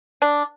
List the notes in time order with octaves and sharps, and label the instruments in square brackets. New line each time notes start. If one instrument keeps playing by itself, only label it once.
[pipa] D4